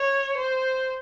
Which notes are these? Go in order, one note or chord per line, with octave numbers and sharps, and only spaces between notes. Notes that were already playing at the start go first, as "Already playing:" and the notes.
Already playing: C#5
C5